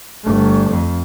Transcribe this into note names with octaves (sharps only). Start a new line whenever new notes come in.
G1 A3
F2